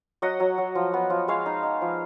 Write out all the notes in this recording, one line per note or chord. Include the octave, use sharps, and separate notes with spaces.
F#3 D#5 F#5
F#3
F#3
F3
B3
F3
G#3 C#5 F5
D#4
D#4
F3